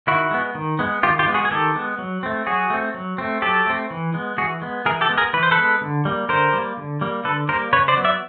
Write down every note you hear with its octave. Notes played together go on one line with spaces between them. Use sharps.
D#3 E4 F#4
G#3 B3
D#3
G#3 B3
D#3 F4 G4
F4 G4
G#3 B3
F#4 G#4
G#4
D#3 G4 A4
G#3 B3
F#3
A3 C4
F#3 F#4 G#4
A3 C4
F#3
A3 C4
F#3 G4 A4
A3 C4
E3
G#3 B3
E3 F#4 G#4
G#3 B3
E3 G#4 A#4
G4 A4
G#3 B3
G#4 A#4
E3 B4
C5
A4 B4
G#3 B3
D3
G3 A#3
D3 A#4 C5
G3 A#3
D3
G3 A#3
D3 A4 B4
G3 A#3 A#4 C5
C#3 B4 C#5
C5 D5
F#3 B3
D5 E5